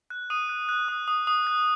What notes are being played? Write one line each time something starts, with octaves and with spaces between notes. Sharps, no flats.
F#6
D#6 D#7
F#6
F#6
D#6
D#6
D#6
F#6